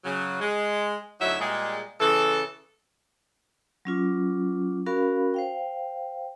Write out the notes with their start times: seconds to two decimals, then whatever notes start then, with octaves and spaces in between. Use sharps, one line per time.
0.04 C#3 F#3
0.40 G#3
1.20 D2 F#3 D#4 E4 E5
1.39 A#2 G3 G#3
2.00 C#3 E3 A4
3.85 F#3 C#4 F4 D6
4.86 C#4 F#4 A#4 F5 B5
5.34 C5 F5 G5